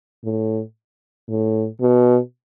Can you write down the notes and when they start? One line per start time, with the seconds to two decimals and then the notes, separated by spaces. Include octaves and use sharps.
0.25 A2
1.30 A2
1.81 B2